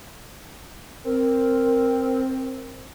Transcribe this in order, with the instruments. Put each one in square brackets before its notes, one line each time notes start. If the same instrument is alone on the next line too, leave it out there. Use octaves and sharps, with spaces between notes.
[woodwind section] C4 [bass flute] A#4